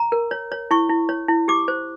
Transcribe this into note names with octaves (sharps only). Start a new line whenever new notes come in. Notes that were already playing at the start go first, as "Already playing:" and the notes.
Already playing: A#5
A#4
C#5
C#5
E4 C#6
E4
C#5
E4
G4 D6
C5